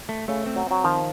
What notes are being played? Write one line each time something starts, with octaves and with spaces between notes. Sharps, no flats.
A3
C#3 A3
C4
F#3
F#3 C4
D#3 F3